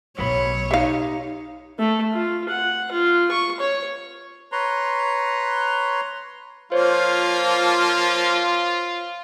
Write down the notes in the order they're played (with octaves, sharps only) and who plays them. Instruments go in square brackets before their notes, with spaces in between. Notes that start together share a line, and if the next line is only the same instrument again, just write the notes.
[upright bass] B1 A2 [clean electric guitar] F#3 B4 B5 [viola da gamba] C#5
[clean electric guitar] D#4 G4 [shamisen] E5 F5
[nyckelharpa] A3
F4
F#5
F4
C#6
C#5
[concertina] B4 C#5 A#5 C6
[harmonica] F3 A#3 [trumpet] F4 [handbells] C5 C#5